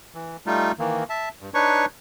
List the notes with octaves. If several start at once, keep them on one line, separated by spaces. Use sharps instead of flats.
E3
G3 A3 D#4 F4
D#3 E3 A#3
E5 A5
G2
D4 D#4 B4 C#5 C#6